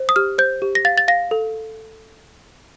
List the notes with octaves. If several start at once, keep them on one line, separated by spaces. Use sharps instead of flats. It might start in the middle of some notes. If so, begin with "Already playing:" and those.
Already playing: C5
D#6
G4 F6
C5 G6
G4
A#6
F5 A6
A6
F5 A#6
A4